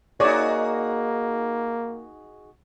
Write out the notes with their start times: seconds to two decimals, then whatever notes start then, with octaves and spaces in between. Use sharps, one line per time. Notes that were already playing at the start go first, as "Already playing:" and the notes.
0.20 A#3 D#4 F#4 G#4 C#5 D5